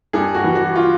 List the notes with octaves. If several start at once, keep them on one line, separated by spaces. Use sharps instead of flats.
G2 G#4
F#4
E3
F#4
F4